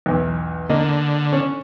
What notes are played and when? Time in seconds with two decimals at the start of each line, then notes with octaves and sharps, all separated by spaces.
0.06 B1 E2
0.70 D3 A#3 D#5
1.32 C#4